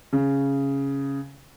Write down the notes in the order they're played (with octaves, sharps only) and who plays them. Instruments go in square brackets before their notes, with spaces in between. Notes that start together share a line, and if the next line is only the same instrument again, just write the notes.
[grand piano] C#3